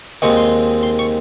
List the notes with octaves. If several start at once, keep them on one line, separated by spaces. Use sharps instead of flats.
D#2 D#3 G#3 C4 C#6
C6
C6
C#6